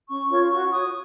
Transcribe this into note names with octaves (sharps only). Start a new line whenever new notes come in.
C#4 C#6
F4 A#4 C#5
F#4 C#6
C#5 D#6